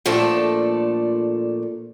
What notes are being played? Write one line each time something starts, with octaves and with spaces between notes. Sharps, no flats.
A#2 F3 A3 D4 A4